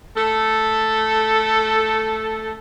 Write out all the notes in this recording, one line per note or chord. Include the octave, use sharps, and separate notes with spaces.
A3 A4